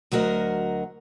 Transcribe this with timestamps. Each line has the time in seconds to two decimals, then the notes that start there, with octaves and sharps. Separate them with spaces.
0.12 D2 F#3 F#4 A#4 D#5